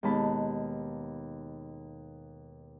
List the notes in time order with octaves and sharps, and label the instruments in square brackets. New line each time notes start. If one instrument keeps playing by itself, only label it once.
[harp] D#2 B2 G#3 A5 B5